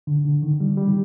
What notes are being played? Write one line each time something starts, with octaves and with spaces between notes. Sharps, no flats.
D3
D3
D#3
G3
G3
D#3